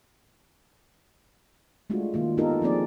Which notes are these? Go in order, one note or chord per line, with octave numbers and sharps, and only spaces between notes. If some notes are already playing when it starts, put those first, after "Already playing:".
G#3 A3 D4 F4 F#4
D#3 A#3 F4
B3 D#4 F4 G4 A4 A#4
F3 A#3 C4 D4 G#4 D5